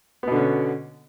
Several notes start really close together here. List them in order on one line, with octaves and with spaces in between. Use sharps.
B3 B2 D3 C#4